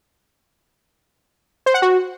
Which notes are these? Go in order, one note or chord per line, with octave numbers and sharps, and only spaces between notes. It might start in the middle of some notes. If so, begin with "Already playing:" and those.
C5
F#5
F#4